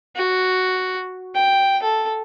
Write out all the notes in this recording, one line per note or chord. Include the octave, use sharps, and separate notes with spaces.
F#4
G5
A4